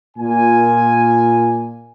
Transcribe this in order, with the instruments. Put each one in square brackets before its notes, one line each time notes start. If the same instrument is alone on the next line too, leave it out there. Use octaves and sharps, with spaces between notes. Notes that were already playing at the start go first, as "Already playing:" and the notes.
[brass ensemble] A#2 G#5